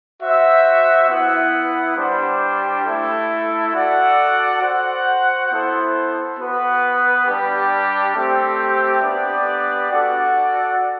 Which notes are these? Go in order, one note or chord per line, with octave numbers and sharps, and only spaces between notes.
F#4 C5 E5
B3 E4 B4 F#5
G3 D4 G4 C5
A3 E4 A4
F#4 A4 D5 F#5
F#4 C5 F#5
B3 E4 A4 C5
B3 F#4 B4
G3 D4 G4
A3 C4 G4 C5
B3 D4 G4 B4 D5
F#4 A4 D5 F#5